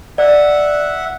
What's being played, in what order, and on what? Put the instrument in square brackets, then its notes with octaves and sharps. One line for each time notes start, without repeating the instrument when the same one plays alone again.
[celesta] D5 [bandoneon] E5 F#5